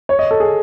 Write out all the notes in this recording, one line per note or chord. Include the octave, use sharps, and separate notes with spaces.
C#5
D#5
A4
G#4